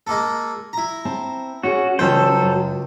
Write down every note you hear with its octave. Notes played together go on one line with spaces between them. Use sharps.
G#3 A#3 A4
E4 A#5
C4 C5 A5
C#4 F#4 G#4
C#2 E3 F#3 G3 C#4 A4 C5 G5
F#2